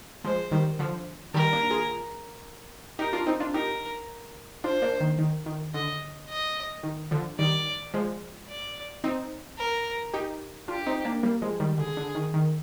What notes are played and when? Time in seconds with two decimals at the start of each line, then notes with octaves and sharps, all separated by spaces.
0.24 F3 G#3 C5
0.51 D#3 G3
0.79 D3 F3
1.34 D#3 G3 A#4
1.53 A#3 D4
1.70 F4 G#4
2.99 D#4 G4 A#4
3.13 D4 F4
3.27 C4 D#4
3.40 D4 F4
3.54 D#4 G4 A#4
4.64 D4 F4 C5
4.82 A#3 D4
5.00 D#3
5.18 D#3
5.46 D#3
5.74 D3 D#5
6.29 D#5
6.83 D#3
7.11 D3 F3
7.38 D#3 G3 D5
7.94 F3 G#3
8.48 D5
9.04 C4 D#4
9.59 A#4
10.14 D#4 G4
10.68 D4 F4 G4
10.87 C4 D#4
11.05 A#3 D4
11.23 G3 A#3
11.42 F3 G#3
11.60 D#3 G3
11.78 D3 G#4
11.97 D3
12.15 D#3
12.34 D#3